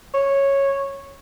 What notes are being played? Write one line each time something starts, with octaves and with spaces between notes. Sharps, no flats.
C#5